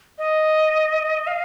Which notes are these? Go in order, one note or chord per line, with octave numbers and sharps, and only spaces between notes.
D#5
F5